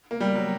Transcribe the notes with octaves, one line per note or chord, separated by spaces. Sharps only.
A#3
G3
F#3